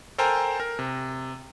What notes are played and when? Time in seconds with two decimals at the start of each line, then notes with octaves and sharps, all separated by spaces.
0.18 A4 A#4 C5 G5 G#5 A#5
0.60 A#4
0.79 C3